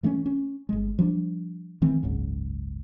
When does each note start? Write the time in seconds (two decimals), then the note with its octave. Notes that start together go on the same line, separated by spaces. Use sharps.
0.03 E3 A3 C4 C#4
0.26 C#4
0.69 G1 G#3
0.99 F3 G3 A#3 D4
1.82 D#3 E3 A3 C4
2.03 F#1 C#2 G#2